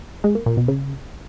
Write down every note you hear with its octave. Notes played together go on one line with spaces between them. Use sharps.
G#3
A#3
A#2
B2
C#3